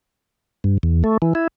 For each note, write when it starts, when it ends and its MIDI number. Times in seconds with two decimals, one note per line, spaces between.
0.64 0.78 43
0.83 1.03 40
1.04 1.17 57
1.22 1.33 52
1.35 1.48 64